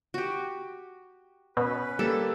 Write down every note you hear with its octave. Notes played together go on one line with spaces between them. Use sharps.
F#4 G4
B2 C#4 B4
G3 A#3 A4